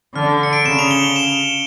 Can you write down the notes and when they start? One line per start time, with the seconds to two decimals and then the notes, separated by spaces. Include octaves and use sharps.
0.15 D3 F6
0.43 C#7
0.53 D7
0.66 C#3 E7
0.79 F7
0.91 G7
1.03 G7
1.16 E7